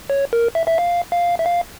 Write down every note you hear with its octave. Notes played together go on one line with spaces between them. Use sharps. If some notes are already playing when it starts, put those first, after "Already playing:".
C#5
A#4
E5
E5
F5
F5
E5
F5